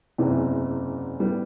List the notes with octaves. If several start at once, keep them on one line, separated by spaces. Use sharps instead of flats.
F#1 E2 C3 E3
A2 G3 B3